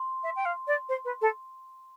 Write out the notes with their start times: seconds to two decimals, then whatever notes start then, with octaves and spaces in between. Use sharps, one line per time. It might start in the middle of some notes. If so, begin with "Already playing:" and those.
Already playing: C6
0.23 E5
0.35 G5
0.45 F5
0.67 D5
0.88 C5
1.04 B4
1.21 A4